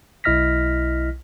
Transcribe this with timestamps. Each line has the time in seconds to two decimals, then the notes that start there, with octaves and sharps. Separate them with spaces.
0.24 B1 E4 D#5 F6 A#6 B6